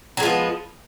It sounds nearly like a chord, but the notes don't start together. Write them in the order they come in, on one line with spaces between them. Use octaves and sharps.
F#3 G#3 F3 B3